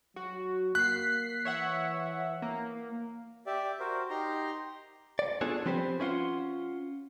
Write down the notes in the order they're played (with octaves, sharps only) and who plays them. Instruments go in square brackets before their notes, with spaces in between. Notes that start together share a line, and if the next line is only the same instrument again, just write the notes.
[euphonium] F#3 [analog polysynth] F#4
[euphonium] A#3 [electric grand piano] F#6 [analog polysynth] B6 C7
[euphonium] E3 [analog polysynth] C#5 E5 F#5
[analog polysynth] A#3
[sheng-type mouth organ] G4 D5 E5
F#4 A#4 C5
D#4 G4 A#5 C6
[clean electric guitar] D5
B3 D4 F4 G#4 A4 C#5
F3 C4 G4 B4 C5
C#4 E4 F4 F#5 C6